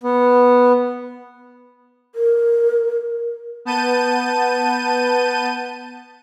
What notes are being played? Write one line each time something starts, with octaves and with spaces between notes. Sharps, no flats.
B3
A#4
B3 A5 G6 D#7